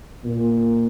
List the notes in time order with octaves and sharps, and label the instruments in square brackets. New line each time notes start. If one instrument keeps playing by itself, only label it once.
[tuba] A#2